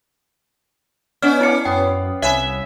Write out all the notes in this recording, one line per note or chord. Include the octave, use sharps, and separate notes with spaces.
B3 C#4 D5 D#5 F6
E4 A#4 F5 D6 C#7
F#2 B3 G5
C2 C#5 E5 G#5 B5